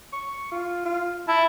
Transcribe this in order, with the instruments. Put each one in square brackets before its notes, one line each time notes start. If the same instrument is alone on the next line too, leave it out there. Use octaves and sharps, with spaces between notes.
[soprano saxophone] C#6
F4
F4
[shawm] E4 [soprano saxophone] A5